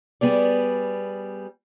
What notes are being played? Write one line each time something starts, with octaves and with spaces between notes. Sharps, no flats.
G3 B3 G#4 D5